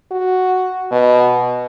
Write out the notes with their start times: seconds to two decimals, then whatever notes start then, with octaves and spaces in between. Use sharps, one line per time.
0.11 F#4
0.92 B2